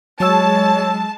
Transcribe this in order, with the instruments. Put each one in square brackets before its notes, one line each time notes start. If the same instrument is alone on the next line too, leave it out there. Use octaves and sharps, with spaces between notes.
[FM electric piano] F#3 E6 [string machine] G#3 [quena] C#5 [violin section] A5